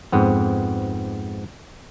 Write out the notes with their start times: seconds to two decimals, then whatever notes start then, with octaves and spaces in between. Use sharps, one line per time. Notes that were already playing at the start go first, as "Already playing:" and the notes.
0.12 F2 G#2 B3 C4